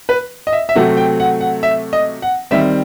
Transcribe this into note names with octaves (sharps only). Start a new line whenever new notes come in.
B4
D#5
E5
E5
C3 F#3 A3 C4 F#5
G5
F#5
F#5
E5
D#5
F#5
D#3 G3 C4 E5